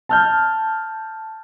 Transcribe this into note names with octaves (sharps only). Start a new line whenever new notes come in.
A5 F6 G6